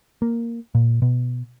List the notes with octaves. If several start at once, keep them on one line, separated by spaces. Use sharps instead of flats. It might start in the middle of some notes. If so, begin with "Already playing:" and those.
A#3
A#2
B2